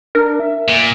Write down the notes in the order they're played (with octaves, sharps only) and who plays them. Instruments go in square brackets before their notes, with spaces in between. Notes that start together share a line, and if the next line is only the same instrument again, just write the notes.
[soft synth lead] D4 [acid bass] A#4
[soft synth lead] E5
[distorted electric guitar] A#2